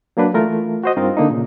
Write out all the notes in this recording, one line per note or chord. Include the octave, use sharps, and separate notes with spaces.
F#3 A#3 D4 B4
E3 A3 F4 A#4
F#4 C5 D#5
G2 C4 D#4 F4 A#4 F5
D3 A#3 D4 D#4
A#2 C#3